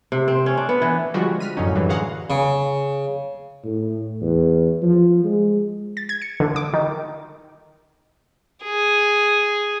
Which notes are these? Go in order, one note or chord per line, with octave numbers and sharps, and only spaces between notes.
C3
C4
C#4
D4
B3
E3
D3 F3 G3 G#3 F4 F#4
F6 B6 D#7
F#2 A2 D3 F3 C#4 D#4
F#2 D3 E3 F#3 G3
F#4 G#4 F5 F#5 A#5 C6
C#3
A2
E2
F3
G#3
A6
G#6
C#7
D3
D6
D#3
G#4